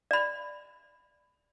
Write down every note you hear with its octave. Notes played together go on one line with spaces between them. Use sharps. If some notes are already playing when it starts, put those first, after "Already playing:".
D5 B5